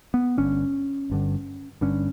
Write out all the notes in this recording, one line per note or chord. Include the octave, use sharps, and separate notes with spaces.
B3
G1 G2 D3 C#4
G1 G2 D3
G1 G2 D3 C#4